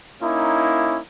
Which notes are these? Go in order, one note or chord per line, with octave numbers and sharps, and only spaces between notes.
A#3 C#4 D#4 E4